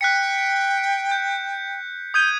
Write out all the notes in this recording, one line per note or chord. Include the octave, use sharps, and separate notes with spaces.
G5 F#6 B6 C#7
G6
D#6 G6 G#6 D#7